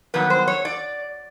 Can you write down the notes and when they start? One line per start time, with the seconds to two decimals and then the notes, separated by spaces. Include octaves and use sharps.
0.14 G2 D#3 F#3 B3 B4
0.30 C5
0.48 C#5
0.65 D5